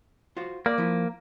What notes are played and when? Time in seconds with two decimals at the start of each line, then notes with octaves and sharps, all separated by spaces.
0.37 F4 F#4 C5
0.66 A#3 D5
0.78 F3 E4